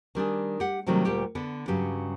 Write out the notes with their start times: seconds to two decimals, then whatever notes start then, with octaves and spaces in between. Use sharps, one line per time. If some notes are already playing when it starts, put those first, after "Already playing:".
0.15 D#3 G3 D4 G#4
0.60 G4 F#5
0.86 C3 D#3 F#3 G3 A3
1.05 D2 A#2 G3 G4 G5
1.35 D3 B3 D4
1.68 G2 C#3 F#3 G4